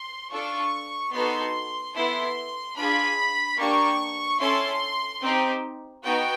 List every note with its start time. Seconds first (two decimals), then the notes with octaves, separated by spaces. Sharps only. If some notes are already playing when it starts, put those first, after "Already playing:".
Already playing: C6
0.30 D4 F4 A4 C#6
1.12 B3 D#4 F#4 A4 C6
1.94 B3 E4 A4 C6
2.76 D4 F4 G#4 B5
3.57 A#3 D4 G4 C#6
4.39 C#4 E4 A4 C6
5.21 C4 D#4 G4
6.03 B3 D#4 F#4 G5